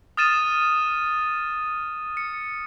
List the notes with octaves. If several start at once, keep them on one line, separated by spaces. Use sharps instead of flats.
D#6 F6 A6 D#7 E7
C#7